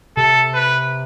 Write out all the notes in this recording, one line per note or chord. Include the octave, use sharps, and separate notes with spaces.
C3 A4
B4